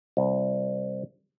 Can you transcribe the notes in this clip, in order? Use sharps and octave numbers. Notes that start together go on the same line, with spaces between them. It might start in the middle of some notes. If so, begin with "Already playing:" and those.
C2